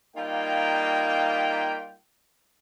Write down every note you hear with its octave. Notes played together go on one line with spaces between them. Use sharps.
G3 A#3 D#4 F4 G5